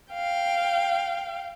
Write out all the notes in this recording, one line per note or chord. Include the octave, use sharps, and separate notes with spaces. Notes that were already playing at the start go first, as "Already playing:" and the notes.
F5 G5